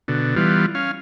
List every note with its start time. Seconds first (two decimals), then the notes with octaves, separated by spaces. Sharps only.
0.08 B2 D3
0.36 E3 G3 B3 F4
0.75 C#4 F5